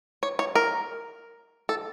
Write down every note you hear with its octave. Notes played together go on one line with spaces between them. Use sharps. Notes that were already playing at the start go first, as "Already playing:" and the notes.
C#5
C#5
A#4
A4